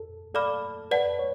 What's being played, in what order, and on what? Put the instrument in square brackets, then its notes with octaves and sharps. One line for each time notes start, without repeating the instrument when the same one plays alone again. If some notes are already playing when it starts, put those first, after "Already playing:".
Already playing: [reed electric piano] A4
[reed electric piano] A4 [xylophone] D5 F5 B5 D6 F6
[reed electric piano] B4 [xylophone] D5 F#5 A5
[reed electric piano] C#5